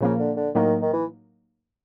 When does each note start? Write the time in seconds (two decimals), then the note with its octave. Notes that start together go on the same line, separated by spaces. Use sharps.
0.01 A#2 C#3 F3 A#3
0.19 D3
0.37 D3
0.55 A2 D#3 F#3 A#3 D#4
0.82 D#3
0.93 E3